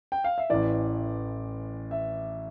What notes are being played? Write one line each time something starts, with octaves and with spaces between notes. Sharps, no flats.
G5
F5
E5
A1 A2 E3 D5
E5